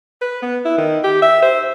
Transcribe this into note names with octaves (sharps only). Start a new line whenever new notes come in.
B4
B3
E4
D#3
G4
E5
C5